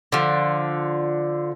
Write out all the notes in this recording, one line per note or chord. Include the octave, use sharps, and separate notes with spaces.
D3 F3